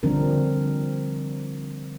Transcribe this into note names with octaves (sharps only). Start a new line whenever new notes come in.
D3 F3 G3 C4 D4 A#4